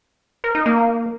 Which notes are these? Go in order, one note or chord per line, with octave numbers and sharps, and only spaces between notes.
A#4
D#4
A#3